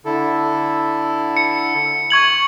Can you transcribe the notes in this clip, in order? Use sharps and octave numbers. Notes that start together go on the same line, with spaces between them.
D3 E4 A4
C#7
C#6 G#6 F#7